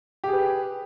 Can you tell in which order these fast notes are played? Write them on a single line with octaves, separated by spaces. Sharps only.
G4 G#4 B4